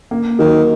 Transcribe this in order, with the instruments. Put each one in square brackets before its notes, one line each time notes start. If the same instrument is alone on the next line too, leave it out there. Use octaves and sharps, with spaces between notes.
[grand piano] A#3
[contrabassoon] D#3 [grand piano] F#3